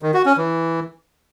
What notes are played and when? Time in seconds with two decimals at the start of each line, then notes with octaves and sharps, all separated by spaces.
0.02 D#3
0.14 F#4
0.26 C#4
0.37 E3